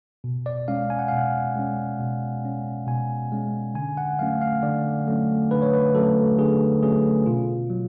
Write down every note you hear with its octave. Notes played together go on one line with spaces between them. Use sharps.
B2
D5
G#3 C#4 F5
G#5
F#5
B2 F5
F#5
G#3 C#4
B2
G#3 C#4
B2 G#5
G#3 C#4
D3 G#5
F#5
F#3 A3 C#4 F5
F5
D3 D5
F#3 A3 C#4
D3 B4
C#5
B4
F#3 A3 C#4 A4
D3 G#4
F#3 A3 C#4 G#4
B2 F4
F#3